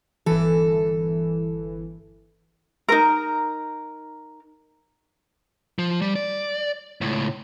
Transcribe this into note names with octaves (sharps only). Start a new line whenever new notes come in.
G1 E3 A4
D#4 A#4
F3
G3
D5
C#2 A2